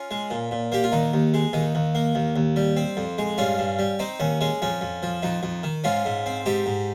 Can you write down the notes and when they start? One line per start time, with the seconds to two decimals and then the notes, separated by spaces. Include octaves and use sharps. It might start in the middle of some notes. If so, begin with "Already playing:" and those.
Already playing: C#4 F4
0.11 G#3
0.30 A#2
0.51 A#2
0.72 A#3 G4
0.84 F4
0.92 D#2 D#4
1.13 D#2
1.34 G#3
1.53 D#2 D#4
1.75 D#2
1.95 A#3
2.15 D#2
2.36 D#2
2.56 G3
2.77 C4
2.97 F2
3.18 G#3
3.38 G2 C#4 F4
3.58 G2
3.79 G3
3.99 C4 D#4
4.20 D#2 C#4
4.41 G#3 C#4
4.62 F2 C#4
4.81 F2
5.03 F3
5.23 F2 D#4
5.43 F2
5.63 D#3
5.84 G#2 C#4 F4
6.05 G#2
6.26 C4
6.46 G#2 D#4 G4
6.66 G#2